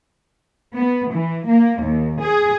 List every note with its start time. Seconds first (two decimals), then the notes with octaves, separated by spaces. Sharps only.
0.75 B3
1.14 E3
1.48 A#3
1.83 D#2
2.22 G#4